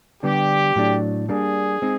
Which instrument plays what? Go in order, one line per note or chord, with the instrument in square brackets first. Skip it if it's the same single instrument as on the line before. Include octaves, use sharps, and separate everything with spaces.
[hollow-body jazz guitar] D3 G3 B3 D4 [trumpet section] G4
[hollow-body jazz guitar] A2 F#3 A3 D4
[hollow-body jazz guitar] G3 A#3 D4 [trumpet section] G#4
[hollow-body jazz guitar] G#3 C4 D#4